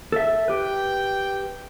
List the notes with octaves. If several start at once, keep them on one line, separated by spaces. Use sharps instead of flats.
A4 E5
G4 B4 G5